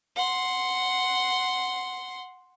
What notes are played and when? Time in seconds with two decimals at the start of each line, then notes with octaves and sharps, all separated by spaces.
0.16 F#5 C6